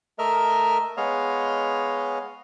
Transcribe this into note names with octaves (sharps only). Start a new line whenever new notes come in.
A3 A#4 D#5 E5 F6
G#3 B3 C#5 D#5 F5